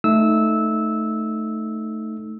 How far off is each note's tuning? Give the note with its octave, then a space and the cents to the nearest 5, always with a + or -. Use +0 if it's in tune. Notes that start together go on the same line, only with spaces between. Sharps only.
A3 +0 D#4 +0 E6 -15